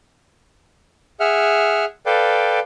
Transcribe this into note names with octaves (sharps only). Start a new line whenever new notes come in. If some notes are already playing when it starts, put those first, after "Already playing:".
G#4 E5 F#5 F6
A4 B4 D5 F5 G5